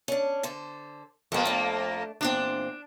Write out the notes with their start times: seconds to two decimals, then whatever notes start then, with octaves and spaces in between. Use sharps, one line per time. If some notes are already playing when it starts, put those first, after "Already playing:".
0.08 C#4 D4
0.43 D3 A4 C5
1.32 F2 G#3 A#3 B3
1.45 A3 D4
2.21 E2 A#2 C4 D4